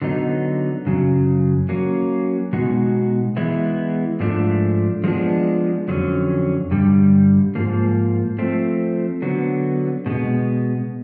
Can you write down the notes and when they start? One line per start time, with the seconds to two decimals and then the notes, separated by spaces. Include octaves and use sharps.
0.02 D3 F#3 B3 D#4
0.86 F#2 C#3 F#3
1.69 F#3 A#3 C#4
2.53 B2 G#3 B3 D#4 F#4
3.37 E3 G#3 B3 E4
4.20 G#2 F3 A3 D4
5.04 F3 G#3 B3 D4
5.88 F2 D3 F#3 A3 C#4
6.71 G2 D3 G3
7.55 G#2 F3 A#3
8.38 F3 A3 C4
9.22 D3 F#3 B3
10.06 B2 G#3 B3